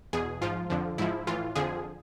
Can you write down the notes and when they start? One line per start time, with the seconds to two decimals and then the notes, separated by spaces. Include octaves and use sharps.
0.13 E2 B2 G#4
0.41 G#2 F3 F4
0.70 F2 D3 F3
0.98 G#2 F3 E4
1.27 A2 E3 F4
1.56 F2 D3 F3 G#4